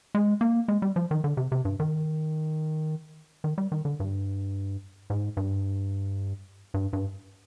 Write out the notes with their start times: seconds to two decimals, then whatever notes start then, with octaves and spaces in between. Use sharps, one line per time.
0.15 G#3
0.41 A#3
0.68 G#3
0.82 G3
0.96 F3
1.11 D#3
1.24 D3
1.37 C3
1.52 C3
1.65 G2
1.80 D#3
3.44 D#3
3.58 G3
3.72 D#3
3.85 D3
4.00 G2
5.10 G#2
5.37 G2
6.74 G2
6.93 G2